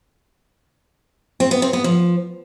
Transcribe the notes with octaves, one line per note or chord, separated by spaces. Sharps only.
C4
B3
C4
B3
F3